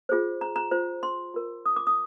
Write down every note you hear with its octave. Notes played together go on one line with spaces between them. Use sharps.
F4 G#4 C5
A#5
A#5
F4 C5
C6
F4 A#4
D#6
D6
D#6